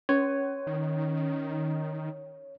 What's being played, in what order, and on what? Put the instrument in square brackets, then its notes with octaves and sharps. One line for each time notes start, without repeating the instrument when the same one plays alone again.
[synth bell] C#4 [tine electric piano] C#5
[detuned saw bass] D#3